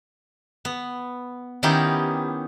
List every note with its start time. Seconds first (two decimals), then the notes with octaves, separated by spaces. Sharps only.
0.65 B3
1.63 D#3 B3 C#4 D#4 E4 G4